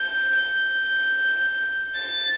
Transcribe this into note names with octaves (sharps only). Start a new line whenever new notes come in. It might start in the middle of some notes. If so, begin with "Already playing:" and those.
Already playing: G6
G6
A6